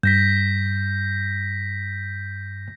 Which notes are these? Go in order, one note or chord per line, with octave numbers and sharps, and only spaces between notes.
G2 G6 A#6 B6